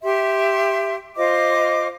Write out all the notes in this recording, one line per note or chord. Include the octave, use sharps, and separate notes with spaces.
G4 E5 C6
F4 C5 D#5 D6